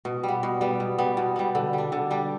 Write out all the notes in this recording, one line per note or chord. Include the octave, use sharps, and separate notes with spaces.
B2
G3 B3
B2
G3 B3
B2
G3 B3
B2
G3 B3
D3
G3 D4
D3
G3 D4